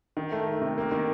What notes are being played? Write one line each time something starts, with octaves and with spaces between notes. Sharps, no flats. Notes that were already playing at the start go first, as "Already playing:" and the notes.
D#3
A3
A3
C3
A#3
D#3